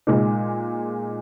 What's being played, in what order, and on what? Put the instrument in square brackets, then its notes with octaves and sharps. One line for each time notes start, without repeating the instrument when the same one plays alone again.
[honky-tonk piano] A#2 G#3 D#4